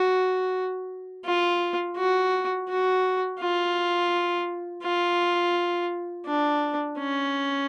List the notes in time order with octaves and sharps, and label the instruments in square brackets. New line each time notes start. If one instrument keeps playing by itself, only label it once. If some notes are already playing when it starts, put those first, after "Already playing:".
Already playing: [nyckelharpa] F#4
F4
F#4
F#4
F4
F4
D4
C#4